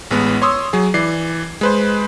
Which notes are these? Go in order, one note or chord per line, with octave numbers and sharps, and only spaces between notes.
A1 G#3 B3
C#5 C6 D#6 E6
F#3 G#4
E3 D5 C7
G#3 B4 C5